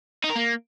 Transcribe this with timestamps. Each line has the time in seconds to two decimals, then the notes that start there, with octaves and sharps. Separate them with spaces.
0.24 D#4
0.30 A#4
0.36 A#3